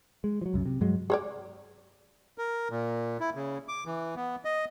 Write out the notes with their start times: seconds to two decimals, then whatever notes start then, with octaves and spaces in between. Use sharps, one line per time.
0.24 G#3
0.41 F3 F#3
0.54 C2 F#2 C#3
0.66 C3
0.81 G2 F#3 G#3
1.10 G#4 C#5 D5
2.38 A#4
2.71 A#2
3.20 E4
3.35 C#3
3.68 D6
3.86 E3
4.16 B3
4.45 D#5